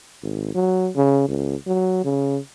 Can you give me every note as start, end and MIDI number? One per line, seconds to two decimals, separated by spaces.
0.23 0.53 32
0.55 0.90 54
0.96 1.24 49
1.28 1.56 37
1.66 2.00 54
2.04 2.38 49